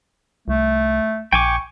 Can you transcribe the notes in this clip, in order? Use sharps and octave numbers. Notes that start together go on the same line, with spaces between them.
C2 A3
A#1 G5 G#5 C#6 D6